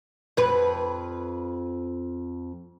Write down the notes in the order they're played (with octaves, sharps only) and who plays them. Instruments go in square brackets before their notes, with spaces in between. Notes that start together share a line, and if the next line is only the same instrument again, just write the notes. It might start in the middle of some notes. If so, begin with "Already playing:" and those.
[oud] F2 B4